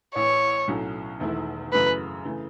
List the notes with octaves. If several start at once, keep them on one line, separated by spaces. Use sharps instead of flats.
A1 A2 E3 C#5
B1 A2 F#3 A3 C#4
E1 E2 D#3 A3 E4
F#2 C#3 E3 A3 B4
C#3 E3 A3